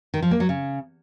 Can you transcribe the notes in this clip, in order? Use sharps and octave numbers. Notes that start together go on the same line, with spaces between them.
D#3
F3
A#3
F#3
C#3